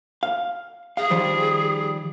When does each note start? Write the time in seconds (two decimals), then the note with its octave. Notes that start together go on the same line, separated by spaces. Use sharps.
0.23 F5
0.97 G#4 F5
1.10 D#3 F3 G3